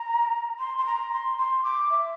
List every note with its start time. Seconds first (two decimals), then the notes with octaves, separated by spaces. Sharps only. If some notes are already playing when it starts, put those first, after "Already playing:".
Already playing: A#5
0.59 C6
0.77 C6
0.86 A#5
1.12 C6
1.38 C6
1.64 D6
1.90 E5